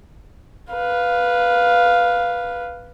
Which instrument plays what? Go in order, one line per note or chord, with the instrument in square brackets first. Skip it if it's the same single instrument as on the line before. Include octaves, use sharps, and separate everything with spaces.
[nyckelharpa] B4 F5